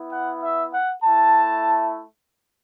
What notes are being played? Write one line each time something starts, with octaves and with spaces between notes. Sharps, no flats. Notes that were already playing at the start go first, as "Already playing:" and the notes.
Already playing: B3 E4
F#5
E5
F#5
A3 E4 A5